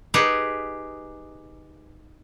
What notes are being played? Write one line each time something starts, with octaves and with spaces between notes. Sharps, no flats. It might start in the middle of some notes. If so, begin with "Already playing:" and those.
D#4 G4 G#4 B4